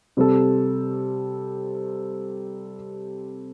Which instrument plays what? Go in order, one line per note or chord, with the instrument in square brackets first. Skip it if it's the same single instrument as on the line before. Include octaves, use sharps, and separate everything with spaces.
[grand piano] C3 G3 C4 A4